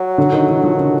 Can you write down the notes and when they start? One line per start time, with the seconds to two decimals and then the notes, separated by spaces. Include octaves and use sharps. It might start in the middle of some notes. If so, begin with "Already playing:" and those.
Already playing: F#3
0.18 D3
0.33 D#3
0.48 E3
0.64 F3
0.79 C#3